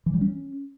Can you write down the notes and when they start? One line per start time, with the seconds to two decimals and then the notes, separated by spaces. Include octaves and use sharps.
0.06 E3
0.14 G3
0.21 C#4